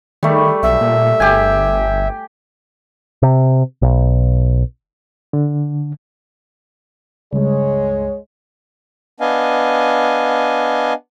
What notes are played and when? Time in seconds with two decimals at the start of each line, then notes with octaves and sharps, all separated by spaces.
0.23 D#3 G3 A3
0.63 B1 E5
0.81 A#2
1.20 G1 G4 G#5
3.22 C3
3.82 B1
5.33 D3
7.33 C#2 G2 G#3 C#5
9.20 B3 D4 D#5 F5 G#5